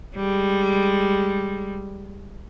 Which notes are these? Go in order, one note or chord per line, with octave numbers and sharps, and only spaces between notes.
G3 G#3